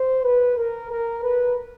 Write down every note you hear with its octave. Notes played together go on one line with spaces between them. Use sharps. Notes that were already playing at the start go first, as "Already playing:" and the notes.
Already playing: C5
B4
A#4
A#4
B4